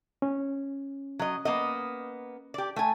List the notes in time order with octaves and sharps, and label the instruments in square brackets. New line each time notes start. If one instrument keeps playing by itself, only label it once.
[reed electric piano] C#4
[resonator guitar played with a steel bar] F#3 D#5
A#3 B3 D#5
G4 D5
A3 G#5